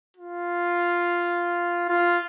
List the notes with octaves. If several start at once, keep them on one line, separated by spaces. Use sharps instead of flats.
F4
F4